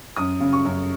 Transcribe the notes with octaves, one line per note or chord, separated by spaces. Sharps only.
F#2 D#6
C#3
C#6
F#2